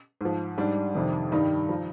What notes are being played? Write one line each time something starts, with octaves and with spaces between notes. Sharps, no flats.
G#2 F3
G#2 G3 D4
F2 C3 D#3
G2 D#3 G3 D#4
F3